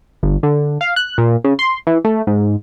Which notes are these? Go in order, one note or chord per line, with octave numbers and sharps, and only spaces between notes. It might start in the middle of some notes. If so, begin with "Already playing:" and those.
G1
D3
F5
F#6
A#2
C#3
C6
E3
A3
G#2